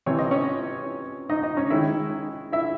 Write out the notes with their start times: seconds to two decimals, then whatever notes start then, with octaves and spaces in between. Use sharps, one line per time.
0.06 C3 E3 C4 C#5
0.19 D#5
0.31 C#4 C#5
1.29 D#4 D#5
1.43 D#4 D#5
1.57 C#4 C#5
1.70 D#3 G#3 C#4 E4 E5
2.52 E4 E5